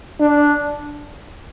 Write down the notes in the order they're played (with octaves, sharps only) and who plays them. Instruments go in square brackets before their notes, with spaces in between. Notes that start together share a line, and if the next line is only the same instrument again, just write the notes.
[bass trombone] D4